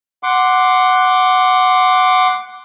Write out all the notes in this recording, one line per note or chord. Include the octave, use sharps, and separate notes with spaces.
F#5 C6 D6